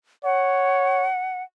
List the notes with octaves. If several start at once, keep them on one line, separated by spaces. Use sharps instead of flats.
C#5 F#5